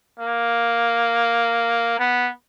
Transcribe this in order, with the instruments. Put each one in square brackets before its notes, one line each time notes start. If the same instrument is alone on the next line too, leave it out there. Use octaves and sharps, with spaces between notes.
[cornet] A#3
B3